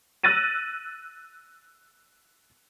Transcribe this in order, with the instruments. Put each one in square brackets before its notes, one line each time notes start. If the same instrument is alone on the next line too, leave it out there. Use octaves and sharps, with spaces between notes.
[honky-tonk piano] E6 F#6 A6 A#6 D#7